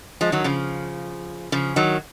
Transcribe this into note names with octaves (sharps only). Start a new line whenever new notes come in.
F3 G#3
D#3 F#3
C#3 F3
C#3 F3
D#3 F#3